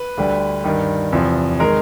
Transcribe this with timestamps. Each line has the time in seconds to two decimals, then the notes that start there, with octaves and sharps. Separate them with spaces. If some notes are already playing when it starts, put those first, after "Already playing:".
Already playing: B4
0.17 D2 D3 G3
0.64 G2 D#3 G3
1.12 E2 C3 F3
1.60 D#3 G#3 A#4